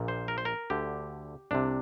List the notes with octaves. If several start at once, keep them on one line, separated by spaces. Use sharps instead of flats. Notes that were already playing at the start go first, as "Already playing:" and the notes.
Already playing: A#1 A#2
C5
A#4
C5
A#4
D2 D3 G4
C2 C3 D4